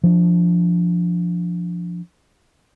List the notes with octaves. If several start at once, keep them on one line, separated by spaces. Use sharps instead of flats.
F3 D4